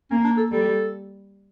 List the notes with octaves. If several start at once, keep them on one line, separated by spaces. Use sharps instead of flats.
A#3 C#4
D4
A4
G3 A4